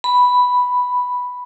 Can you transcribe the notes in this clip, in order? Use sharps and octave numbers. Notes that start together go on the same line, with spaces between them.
B5